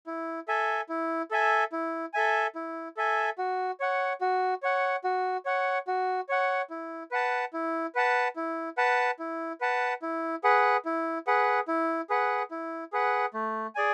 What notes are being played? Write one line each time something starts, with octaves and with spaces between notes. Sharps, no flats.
E4
A4 E5 G#5
E4
A4 E5 G#5
E4
A4 E5 G#5
E4
A4 E5 G#5
F#4
C#5 F#5
F#4
C#5 F#5
F#4
C#5 F#5
F#4
C#5 F#5
E4
B4 F#5 A5
E4
B4 F#5 A5
E4
B4 F#5 A5
E4
B4 F#5 A5
E4
G#4 B4 F#5
E4
G#4 B4 F#5
E4
G#4 B4 F#5
E4
G#4 B4 F#5
A3
G#4 D5 G#5